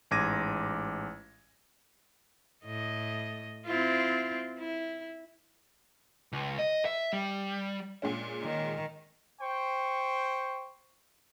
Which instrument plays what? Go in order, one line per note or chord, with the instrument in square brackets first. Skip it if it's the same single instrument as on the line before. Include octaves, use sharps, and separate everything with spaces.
[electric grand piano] A1 G#2 D6 G#6 A#6 D#7
[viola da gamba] A2 D#5
C4 E4 F4
E4
[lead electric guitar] C#2
D#5
E5
G3
[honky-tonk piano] A#2 G#3 C#4
[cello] D#3
[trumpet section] C5 G5 C#6